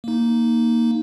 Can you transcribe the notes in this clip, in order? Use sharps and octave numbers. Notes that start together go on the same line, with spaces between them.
A#3 D#4